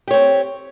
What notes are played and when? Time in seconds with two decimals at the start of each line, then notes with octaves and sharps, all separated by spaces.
0.08 G4
0.11 C#5
0.14 C4